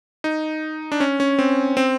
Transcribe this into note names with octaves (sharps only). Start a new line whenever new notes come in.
D#4
D4
C#4
C#4
C4
C4